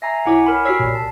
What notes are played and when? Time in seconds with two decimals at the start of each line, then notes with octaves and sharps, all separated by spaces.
0.02 E5 G#5 A#5 A#6 C7
0.25 B1 E4 C#5 F#5 G#5 D6
0.46 A#4 G#5 B5
0.65 F#4 G4 C#5 E6 B6 C7
0.80 C2 A#2
0.95 A5